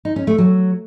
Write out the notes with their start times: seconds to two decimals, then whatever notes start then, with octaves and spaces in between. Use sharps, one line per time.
0.05 D#4
0.16 C#4
0.27 A3
0.38 F#3